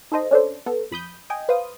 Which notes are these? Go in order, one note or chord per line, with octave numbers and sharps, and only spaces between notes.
D#4 A4 C5 D#5
C#4 D4 A4 C5
B3 A4
F2 B5 D#6 G6
D#5 G5 G#5
B4 C5 F5 D#6